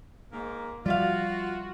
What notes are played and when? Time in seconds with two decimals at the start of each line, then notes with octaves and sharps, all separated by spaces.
0.32 G#2 A#3
0.86 F3 G3 F4 F#4 D5 E5 F5